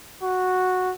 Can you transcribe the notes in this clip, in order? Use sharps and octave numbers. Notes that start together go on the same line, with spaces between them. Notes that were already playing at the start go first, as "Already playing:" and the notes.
F#4